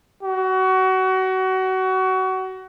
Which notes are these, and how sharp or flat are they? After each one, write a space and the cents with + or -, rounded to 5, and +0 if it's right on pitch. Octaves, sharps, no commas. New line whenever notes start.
F#4 +25